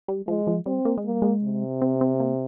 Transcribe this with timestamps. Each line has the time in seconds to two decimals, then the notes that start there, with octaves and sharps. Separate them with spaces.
0.08 G3
0.28 F3 G#3
0.47 F3
0.66 G3 C4
0.85 A#3
0.97 G#3
1.05 G3 A#3
1.22 G#3
1.43 C3
1.82 C4
2.01 C4
2.20 A#3